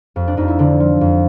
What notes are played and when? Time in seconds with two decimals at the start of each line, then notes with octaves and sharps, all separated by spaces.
0.16 F2
0.27 D4
0.37 F2 D#4
0.48 E4
0.59 D3 D4
0.80 F3
1.01 F2